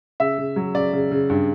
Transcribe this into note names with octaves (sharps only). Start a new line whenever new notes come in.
C#3 E5
C#3
F#3
C#3 D5
C#3
C#3
G2